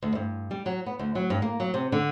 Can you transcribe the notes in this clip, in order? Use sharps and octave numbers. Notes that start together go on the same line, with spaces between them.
D2
G2
G3
F#3
B3
D2
F#3
G2
A#3
F#3
C3
D3